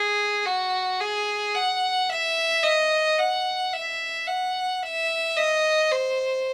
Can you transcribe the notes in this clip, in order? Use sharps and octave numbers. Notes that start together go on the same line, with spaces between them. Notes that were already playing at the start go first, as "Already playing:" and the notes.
Already playing: G#4
F#4
G#4
F#5
E5
D#5
F#5
E5
F#5
E5
D#5
C5